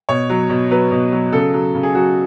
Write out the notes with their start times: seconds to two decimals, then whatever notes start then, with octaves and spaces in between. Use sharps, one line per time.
0.09 B2 C#5
0.29 F#3
0.50 B2
0.71 F#3 B4
0.91 B2
1.12 F#3
1.32 C#3 A4
1.54 F#3
1.75 C#3
1.83 G#4
1.95 F#3 F#4